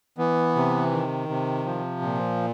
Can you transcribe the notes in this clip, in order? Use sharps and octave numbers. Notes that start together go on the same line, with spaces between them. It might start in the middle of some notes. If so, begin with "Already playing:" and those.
E3 B3
C3
D#3
C3
F3
A#2